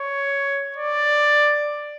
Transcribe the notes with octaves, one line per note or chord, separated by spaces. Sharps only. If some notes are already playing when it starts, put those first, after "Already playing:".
Already playing: C#5
D5